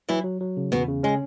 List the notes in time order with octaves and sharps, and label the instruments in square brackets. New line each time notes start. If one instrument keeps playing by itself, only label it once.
[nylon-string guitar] E3 E4 [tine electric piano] F#3
[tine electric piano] F#3
F#3
C#3
[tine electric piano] E2 [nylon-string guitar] B2 B3
[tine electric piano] C#3
[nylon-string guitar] G#3 [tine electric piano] C#4